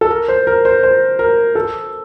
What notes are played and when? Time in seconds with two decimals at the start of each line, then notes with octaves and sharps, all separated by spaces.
0.01 A4
0.10 A#4
0.28 C5
0.47 A#4
0.65 C5
0.83 C5
1.19 A#4
1.55 A4